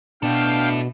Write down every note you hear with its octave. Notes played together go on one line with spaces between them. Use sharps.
B2 D4 E4 A4 F5 G5